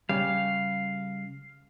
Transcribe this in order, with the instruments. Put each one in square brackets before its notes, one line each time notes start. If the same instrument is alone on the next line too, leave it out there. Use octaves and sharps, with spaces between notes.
[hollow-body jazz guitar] C#3 G3 [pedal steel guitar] F5